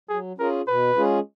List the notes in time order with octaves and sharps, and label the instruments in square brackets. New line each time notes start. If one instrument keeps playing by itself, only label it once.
[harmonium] F#3 [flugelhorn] G#4
[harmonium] C#4 F4 G#4 [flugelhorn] A#4
[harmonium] B2 [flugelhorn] B4
[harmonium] G#3 C#4 F4 G#4